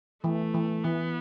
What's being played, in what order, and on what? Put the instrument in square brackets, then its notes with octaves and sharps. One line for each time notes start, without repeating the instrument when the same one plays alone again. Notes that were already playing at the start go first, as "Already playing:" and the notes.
[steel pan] E3 [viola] A3
[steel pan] E3
[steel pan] E3 [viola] B3